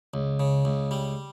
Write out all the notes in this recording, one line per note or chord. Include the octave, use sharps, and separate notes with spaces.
C#2
C#3
C#2
G3